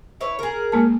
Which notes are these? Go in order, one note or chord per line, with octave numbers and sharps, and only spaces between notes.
E4 B4 C#5
G#4 A#4
G#3 A#3 A5